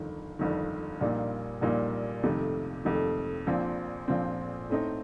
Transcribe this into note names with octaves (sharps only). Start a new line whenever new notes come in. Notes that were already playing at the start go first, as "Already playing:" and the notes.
Already playing: G1 F2 D#3
G1 F2 D#3
A#1 A#2 G3 A#3 D#4
A#1 A#2 G3 A#3 D#4
F2 C3 D#3 A3
F2 C3 D#3 A3
A#1 A#2 F3 C4
A#1 A#2 F3 C4
A2 A3 C4 D#4